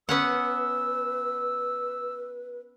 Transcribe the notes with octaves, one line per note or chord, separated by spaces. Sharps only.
B3 C#4 B4 F#5 E6